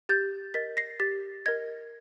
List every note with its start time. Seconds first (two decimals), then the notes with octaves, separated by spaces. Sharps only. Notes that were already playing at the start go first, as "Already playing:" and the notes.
0.09 G4 G6 A6
0.54 A#4 D#5 A6 B6
0.77 A#6 C7
1.00 G4 A6 B6
1.46 A#4 D#5 G#6 A#6